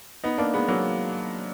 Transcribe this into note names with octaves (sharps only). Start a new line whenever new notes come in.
B3 D#4
A#3 D4
G#3 B3
F#3 A#3